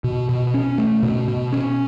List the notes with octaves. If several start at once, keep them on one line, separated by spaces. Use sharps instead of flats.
B2
B2
C#4
A3
B2
B2
C#4